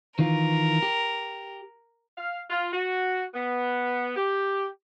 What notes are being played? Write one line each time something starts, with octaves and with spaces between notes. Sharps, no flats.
D#3 E3 F4 A#4
G4
F5
F4
F#4
B3
G4